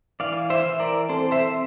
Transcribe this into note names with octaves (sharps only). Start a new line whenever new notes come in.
E3 D5 F5
C5 E5
E3
A#4 D5
C4 A4 C5
C5 E5